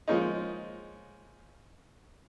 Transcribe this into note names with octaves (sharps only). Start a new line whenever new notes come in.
F3 G#3 A#3 C#4 D#4